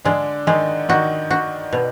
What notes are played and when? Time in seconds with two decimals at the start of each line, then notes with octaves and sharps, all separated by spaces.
0.05 D3 G#3 D4
0.47 D#3 G#3 D#4
0.89 D#3 D#4 F#4
1.31 F#4
1.73 B2